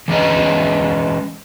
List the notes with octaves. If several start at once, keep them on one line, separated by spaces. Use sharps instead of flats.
E3 G#3 C#4 B4 D#5